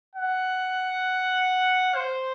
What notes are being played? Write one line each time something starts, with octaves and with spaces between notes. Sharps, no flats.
F#5
C5